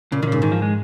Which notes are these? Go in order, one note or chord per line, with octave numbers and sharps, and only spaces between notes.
A#2 C#3
G#2 A#2 C#3 D#3
G#2 D#3
F3
G#3